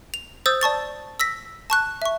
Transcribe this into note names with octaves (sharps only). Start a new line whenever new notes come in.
F7
C5 D#6 E6 G6 A6
D5 A5 C#6 A6
E6 A#6 B6
A5 C#6 F#6
E5 C#6